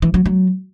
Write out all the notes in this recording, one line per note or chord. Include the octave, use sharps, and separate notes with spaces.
E3
F#3
F#3